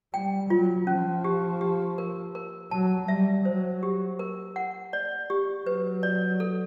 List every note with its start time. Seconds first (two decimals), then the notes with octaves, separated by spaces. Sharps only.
0.14 G3 G5
0.50 F#3 F4
0.87 F3 C#4
1.24 G4
1.61 G4
1.98 A#4
2.35 A#4
2.71 F#3 A5
3.08 G3 E5
3.45 F#3 C5
3.83 G4
4.19 A#4
4.56 F#5
4.93 D5
5.30 G4
5.66 F#3 B4
6.03 D5
6.40 A4